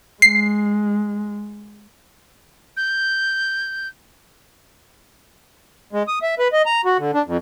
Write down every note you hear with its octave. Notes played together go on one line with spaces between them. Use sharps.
G#3 C7
G6
G#3
D#6
E5
B4
D#5
A#5
F#4
D3
D4
F2